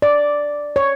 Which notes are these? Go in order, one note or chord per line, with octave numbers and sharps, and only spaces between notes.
D5
C#5